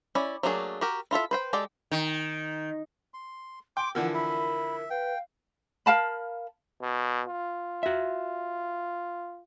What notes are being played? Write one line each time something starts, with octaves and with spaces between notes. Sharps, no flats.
C#4 E4 D5
F#3 A3 A#3 D4 G#4
F#4 G4 A#4
E4 F4 A4 E5
B4 C5 G5
G#3 G4 A4 D5
D#3
C6
G5 C6 D6
D3 E3 F3 A#4 F#5 E6
E5 B5
B4 F5 G5
A#4 F5 A5 B5
B2
F4
F#4 E5